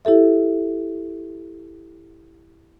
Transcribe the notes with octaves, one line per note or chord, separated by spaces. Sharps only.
E4 G4 A4 E5